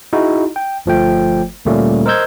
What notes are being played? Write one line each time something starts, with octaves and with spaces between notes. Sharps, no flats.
D#4 E4 F#4 G#4
G5
G1 F3 A3 G5
D2 A#2 G3 A3 A#3 C#4
A#4 C5 D#5 E6 G6 G#6